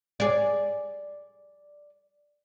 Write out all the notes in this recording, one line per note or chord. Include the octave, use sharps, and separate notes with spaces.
G#4 D5